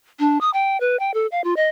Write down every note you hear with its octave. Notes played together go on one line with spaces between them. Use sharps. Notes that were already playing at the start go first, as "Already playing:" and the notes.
D4
D#6
G5
B4
G5
A4
F5
F4
D#5